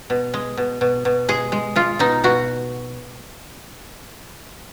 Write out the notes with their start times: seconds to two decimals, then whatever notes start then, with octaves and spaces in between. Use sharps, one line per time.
0.10 B2
0.34 G#3
0.57 B2
0.81 B2
1.05 B2
1.29 G#3 G#4
1.52 G#3
1.76 G#3 F4
1.99 B2 D#4
2.24 B2 F#4